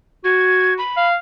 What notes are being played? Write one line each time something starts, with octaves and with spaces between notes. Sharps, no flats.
F#4 G#6
B5
F5